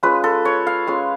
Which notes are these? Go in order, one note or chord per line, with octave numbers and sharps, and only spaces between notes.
G#3 C#4 F4 B4
A4
C#5
F5
G#3 C#4 F4